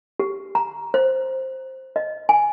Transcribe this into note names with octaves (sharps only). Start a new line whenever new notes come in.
G4
A#5
C5
D#5
G#5